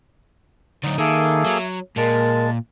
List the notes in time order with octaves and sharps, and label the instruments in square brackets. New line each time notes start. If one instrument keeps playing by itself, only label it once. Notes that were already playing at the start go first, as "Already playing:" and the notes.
[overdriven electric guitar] D3 F#3 [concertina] D#4
[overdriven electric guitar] D#3 [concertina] A#3 G#4 A4 [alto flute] E5
[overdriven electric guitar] F#3
[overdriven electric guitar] A#2 [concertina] G#3 A5 [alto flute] A#4